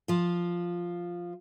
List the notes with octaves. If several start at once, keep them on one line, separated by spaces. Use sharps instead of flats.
F3 F4